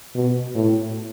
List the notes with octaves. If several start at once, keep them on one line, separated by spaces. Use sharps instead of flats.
B2
A2